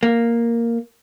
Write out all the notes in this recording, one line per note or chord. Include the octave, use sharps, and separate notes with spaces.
A#3